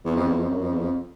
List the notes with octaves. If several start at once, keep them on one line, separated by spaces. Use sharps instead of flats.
E2
F2
E2
F2
F#2
F2
E2
F2